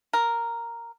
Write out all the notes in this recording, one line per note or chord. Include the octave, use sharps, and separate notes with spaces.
A#4